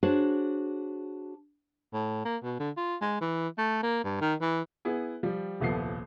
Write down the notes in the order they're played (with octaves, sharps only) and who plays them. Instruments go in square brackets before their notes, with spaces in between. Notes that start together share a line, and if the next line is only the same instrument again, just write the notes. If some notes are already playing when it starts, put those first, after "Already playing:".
[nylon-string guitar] D4 F#4 G#4 C5 C#5 A5
[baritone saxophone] A2
A#3
B2
D3
F4
G#3
E3
A3
A#3
G2
D#3
E3
[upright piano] B3 E4 G#4
F3 G3
D#1 C2 F3 B3 A4 C7